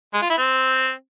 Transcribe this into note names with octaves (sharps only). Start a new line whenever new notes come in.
G#3
F4
E4
C4